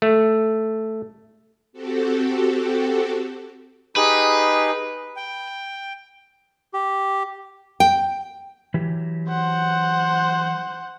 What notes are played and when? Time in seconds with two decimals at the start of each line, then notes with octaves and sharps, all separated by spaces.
0.02 A3
1.73 C4 F#4 G4 A4
3.96 D#4 G4 G#4 B4
5.16 G5
6.74 G4
7.80 G5
8.74 E3 F#3 G4
9.29 C5 F#5